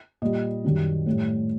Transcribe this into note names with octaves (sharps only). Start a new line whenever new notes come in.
A#2 G3 D#5
F#2 D#3 G3
A2 G3